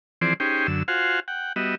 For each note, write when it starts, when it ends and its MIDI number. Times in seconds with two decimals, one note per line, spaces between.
0.21 0.34 52
0.21 0.34 53
0.21 0.34 60
0.21 0.34 68
0.21 0.34 72
0.21 0.34 74
0.40 0.67 61
0.40 0.67 63
0.40 0.67 67
0.40 0.67 68
0.40 0.67 72
0.40 0.67 79
0.67 0.83 42
0.67 0.83 50
0.67 0.83 88
0.88 1.20 65
0.88 1.20 66
0.88 1.20 72
0.88 1.20 77
0.88 1.20 78
0.88 1.20 80
1.28 1.53 78
1.28 1.53 79
1.56 1.75 55
1.56 1.75 59
1.56 1.75 66
1.56 1.75 75
1.56 1.75 76